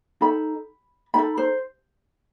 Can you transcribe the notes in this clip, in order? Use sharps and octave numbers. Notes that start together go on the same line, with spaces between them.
D#4 A4 B5
D#4 A4 B5
C5